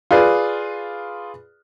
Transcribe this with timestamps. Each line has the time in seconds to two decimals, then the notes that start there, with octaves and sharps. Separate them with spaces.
0.11 F4 G#4 B4 D5